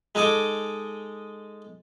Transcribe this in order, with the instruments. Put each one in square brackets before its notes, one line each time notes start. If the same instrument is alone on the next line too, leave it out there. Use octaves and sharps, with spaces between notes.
[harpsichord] G#3 D#4 A4 G#5 D6